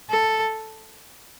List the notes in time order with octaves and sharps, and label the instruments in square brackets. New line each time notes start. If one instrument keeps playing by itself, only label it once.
[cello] A4